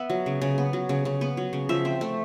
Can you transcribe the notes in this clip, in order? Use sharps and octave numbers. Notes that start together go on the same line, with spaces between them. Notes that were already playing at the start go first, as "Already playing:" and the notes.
Already playing: B3 E5
F#3
C#3
C#3
B3
F#3
C#3
C#3
B3
F#3
C#3
F3 E5
C4
A3